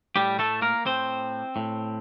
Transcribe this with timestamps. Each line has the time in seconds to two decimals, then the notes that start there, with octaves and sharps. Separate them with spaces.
0.16 A2 G3 G4
0.39 A3 A4
0.62 A#3 A#4
0.85 A2 C4 C5
1.56 A2